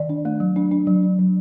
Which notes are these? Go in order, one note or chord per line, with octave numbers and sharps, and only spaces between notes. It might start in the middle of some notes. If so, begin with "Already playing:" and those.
Already playing: D#3 D5
D4
A3
F#3
D4
D4
F#3
D4
F#3